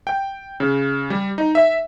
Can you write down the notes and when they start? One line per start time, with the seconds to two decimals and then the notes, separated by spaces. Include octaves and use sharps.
0.07 G5
0.60 C#3
1.10 G3
1.38 D#4
1.55 E5